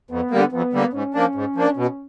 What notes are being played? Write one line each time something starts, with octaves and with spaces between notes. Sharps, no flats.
F2 B3
D3 G3 A#3
F2 B3
D3 G3 A#3
G#2 C#4
F3 A#3 D4
G#2
F3 A#3 D4
B2